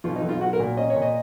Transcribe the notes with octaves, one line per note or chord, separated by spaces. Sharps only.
B1 F4
D#4
B1
F4
F#3 F#4
A#4
A#2
C#4 D#5
C#5
A#2
D#5